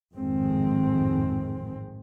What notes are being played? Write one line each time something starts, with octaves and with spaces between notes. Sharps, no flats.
A1 F2 G#2 D#3 G#3 C4